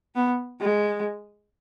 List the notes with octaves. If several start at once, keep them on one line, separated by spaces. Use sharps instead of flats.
B3
G#3